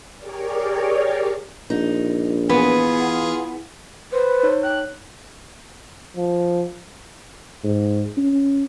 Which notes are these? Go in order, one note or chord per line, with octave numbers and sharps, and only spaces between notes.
G4 G#4 A#4 C#5 D5
A#1 D#4
E3 B3 F4 G#4
B4 C5
D#4 C#5
G5 F#6
F3
G#2
C#4